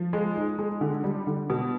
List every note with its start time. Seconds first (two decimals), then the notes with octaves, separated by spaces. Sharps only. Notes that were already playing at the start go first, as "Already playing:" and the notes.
Already playing: F3
0.13 G#3
0.36 D#4
0.59 G#3
0.81 D3
1.04 G3
1.27 D3
1.50 B2